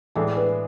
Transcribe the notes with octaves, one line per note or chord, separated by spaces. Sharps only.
A2 E3 G#3 D4 G#4 A4
B4